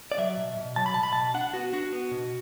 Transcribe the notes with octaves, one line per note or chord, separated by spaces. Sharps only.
D5
F#3 E5
B2
B2
F#3 A5
B5
B2 A5
B5
B2 A5
D4 F#5
B3 F#4
D4 F#4
B3
B2